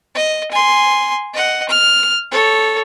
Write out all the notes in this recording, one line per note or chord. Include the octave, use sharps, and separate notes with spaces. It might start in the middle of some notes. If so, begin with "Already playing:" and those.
D#5
G#5 C6
D#5 F#5
F6
A4 C#5